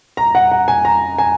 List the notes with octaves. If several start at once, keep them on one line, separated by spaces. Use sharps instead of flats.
A#5
F#5
F#5
G#5
A#5
G#5